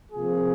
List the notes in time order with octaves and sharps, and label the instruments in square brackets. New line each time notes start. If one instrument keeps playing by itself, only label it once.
[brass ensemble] C3 F3 A#3 F4 G#4